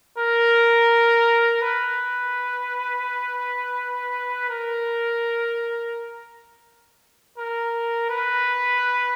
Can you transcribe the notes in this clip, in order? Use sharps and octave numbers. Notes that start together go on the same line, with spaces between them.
A#4
B4
A#4
A#4
B4